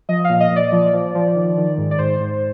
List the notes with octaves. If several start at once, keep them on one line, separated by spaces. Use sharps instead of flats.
F3 D#5
A#2 F5
D#5
A#2
D5
F3
F3
F3
D#3
D#3
G#2
D5
G#2 C5
G#2